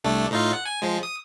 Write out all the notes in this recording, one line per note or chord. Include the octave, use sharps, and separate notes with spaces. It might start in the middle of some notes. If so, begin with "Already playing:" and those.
C2 A3 D4
A2 D#4 F4
F#5
G#5
F3 G#3
D#6